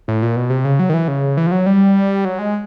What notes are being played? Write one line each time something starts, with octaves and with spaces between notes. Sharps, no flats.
A2
A#2
B2
C3
C#3
F#3
D#3
E3
C#3
E3
F3
F#3
G3
F#3
G#3